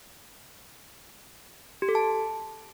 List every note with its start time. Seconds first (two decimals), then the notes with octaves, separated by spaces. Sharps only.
1.82 G4
1.89 A4
1.95 A5